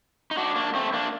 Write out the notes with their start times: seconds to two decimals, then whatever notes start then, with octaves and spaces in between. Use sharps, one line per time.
0.31 D#4
0.37 D4 F#4
0.56 A#3 D4
0.74 A3 C4
0.93 A#3 D4